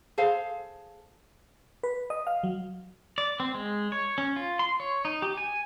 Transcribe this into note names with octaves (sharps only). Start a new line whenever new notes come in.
G#4 A4 C5 F5
B4
D#5
F5
F#3
D5
C4
G#3
C#5
C#4
F4
C6
C#5
D#4
G4
G#5